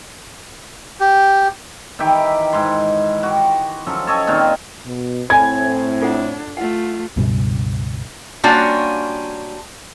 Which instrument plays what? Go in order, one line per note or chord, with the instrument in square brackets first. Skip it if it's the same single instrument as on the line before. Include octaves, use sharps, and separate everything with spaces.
[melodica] G4
[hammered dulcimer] D#3 E3 E4 G4
G#2 C6
F#4 G4
F3 F#3 C#4 A4
A4 C#5 D#5
A#2 D#3 C4 F5
[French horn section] B2
[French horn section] A2 C4 [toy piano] C#5 G#5 B5 [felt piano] G#6
[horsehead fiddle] D4 [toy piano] F4 A4 F#5
[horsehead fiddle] A3 F4 [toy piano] F#5
[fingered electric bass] C#2 G2 B2
[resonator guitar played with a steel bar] G3 A#3 C#4 D4 F4 F#4